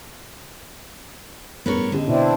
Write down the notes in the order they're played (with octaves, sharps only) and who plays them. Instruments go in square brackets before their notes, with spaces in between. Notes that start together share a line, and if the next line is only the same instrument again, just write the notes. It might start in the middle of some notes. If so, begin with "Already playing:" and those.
[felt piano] A1 E2 G2 [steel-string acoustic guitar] B3 A#4 C#5
[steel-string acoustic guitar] D3 [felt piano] C#4 G4 D#5
[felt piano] B2 B3 [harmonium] C4 D4 E4